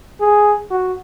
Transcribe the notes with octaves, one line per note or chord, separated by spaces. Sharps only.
G#4
F#4